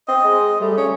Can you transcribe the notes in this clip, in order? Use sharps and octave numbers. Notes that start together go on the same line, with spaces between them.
C4 D#5
G#3
G3 A3
C#4